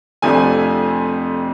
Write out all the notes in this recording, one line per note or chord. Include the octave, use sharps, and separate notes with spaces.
F2 C3 F3 A3 D4 G#5